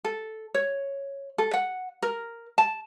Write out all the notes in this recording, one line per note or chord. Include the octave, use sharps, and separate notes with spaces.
A4
C#5
A4
F#5
A#4
A5